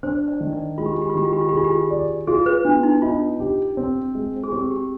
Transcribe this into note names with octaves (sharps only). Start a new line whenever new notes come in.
D4 C5
D5
D#3
D5
G#3 F4
G4
F4
G4
F4
D#3 G4
F4
G4
F4
G4
F4 G#4
G4
F4
D5
F4 G#4
B4
B3 D4
D#4
D#4 F4
G4
C4
G#3
G#4
C4 G4
G4